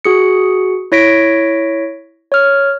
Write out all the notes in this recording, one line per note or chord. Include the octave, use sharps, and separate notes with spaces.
F#4 G#4 C#7
E4 C#5 A#6 B6 D7
C#5 F6